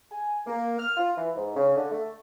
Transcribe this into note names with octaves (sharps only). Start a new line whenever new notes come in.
G#5
A#3
F6
F4
E3
G#2
C#3
D3
A3